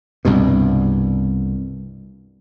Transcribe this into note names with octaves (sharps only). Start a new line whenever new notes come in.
C2 G2 B2